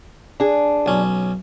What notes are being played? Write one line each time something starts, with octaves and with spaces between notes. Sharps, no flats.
D4 G#4
B1 C#4